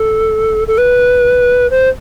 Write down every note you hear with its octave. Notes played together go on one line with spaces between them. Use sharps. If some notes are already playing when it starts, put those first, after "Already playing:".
Already playing: A4
A4
B4
C5